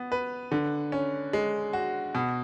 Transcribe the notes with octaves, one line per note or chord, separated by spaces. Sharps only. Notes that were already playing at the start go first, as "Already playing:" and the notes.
Already playing: B3
B4
D3
C#4
G#3
F#4
B2